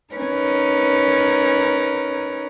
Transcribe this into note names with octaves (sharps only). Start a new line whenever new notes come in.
C#4 D#4 A#4 B4